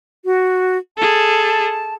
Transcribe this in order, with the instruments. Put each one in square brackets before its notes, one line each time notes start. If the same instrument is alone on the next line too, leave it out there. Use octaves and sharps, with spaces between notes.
[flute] F#4
[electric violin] G#4 A4 [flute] A5